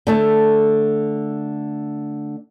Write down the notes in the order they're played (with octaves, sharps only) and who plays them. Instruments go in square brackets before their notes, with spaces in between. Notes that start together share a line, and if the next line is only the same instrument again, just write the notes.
[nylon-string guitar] D3 A3 A5